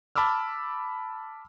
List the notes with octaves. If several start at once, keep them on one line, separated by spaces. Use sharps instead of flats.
A5 B5 D6 E6 F6